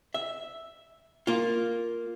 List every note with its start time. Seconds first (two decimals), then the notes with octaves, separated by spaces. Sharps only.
0.14 E5
1.27 A#3 F4